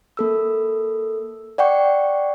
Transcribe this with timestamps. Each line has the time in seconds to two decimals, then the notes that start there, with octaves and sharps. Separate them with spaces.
0.17 A#3 A4 E6
1.58 D5 F#5 G5 C#6